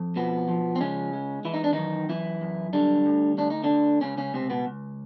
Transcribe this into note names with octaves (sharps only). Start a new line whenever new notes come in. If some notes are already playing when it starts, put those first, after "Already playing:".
Already playing: F2
B2 F3 B3
F3
C4
C#3 G#3 C#4
G#3
E3 E4
D#4
D4
F#2 D#3 D#4
F#2 E3 E4
F#2
D3 G3 D4
D2
D2 D4
D#4
D3 D4
D2
C#2 C#3 C#4
C#3 C#4
C#2 C3 C4
B2 B3
C#2